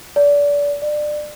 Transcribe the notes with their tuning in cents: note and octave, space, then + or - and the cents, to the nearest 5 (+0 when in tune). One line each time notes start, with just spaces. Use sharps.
D5 -30
D5 +25